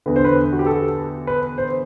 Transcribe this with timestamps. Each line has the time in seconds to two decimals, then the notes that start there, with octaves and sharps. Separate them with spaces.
0.06 E2 D3 B4
0.16 C5
0.25 B4
0.52 F#4
0.59 G4
0.66 A4
1.27 B4
1.58 C5